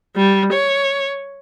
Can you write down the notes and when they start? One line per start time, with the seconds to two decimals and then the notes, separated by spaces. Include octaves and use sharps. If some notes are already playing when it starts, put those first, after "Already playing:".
0.16 G3
0.53 C#5